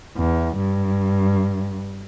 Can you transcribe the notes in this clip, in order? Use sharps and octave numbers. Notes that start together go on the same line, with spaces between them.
E2
G2